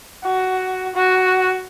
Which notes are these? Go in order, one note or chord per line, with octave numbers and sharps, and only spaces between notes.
F#4
F#4